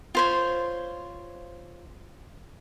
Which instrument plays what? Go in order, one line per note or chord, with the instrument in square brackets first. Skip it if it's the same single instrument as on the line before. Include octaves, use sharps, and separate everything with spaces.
[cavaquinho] F4 C5 C#5